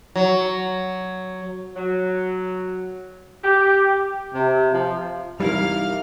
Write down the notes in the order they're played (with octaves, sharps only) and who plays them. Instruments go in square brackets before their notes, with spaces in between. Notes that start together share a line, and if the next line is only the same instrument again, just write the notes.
[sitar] F#3
[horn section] F#3
G4
C3
F3
[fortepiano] G#2 C3 E3 [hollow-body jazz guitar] G3 E4 A#4 [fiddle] F5 F6